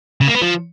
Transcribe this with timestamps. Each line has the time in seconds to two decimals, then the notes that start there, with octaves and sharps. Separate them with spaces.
0.21 C#3
0.28 A#3
0.35 B3
0.42 F3